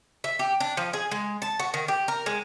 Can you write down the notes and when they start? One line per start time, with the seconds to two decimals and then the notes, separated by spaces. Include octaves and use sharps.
0.24 E5
0.39 G4
0.60 D4
0.77 F3
0.93 G#4
1.11 G#3
1.42 A5
1.59 F#4
1.74 D#3
1.88 G4
2.08 A#4
2.26 G#3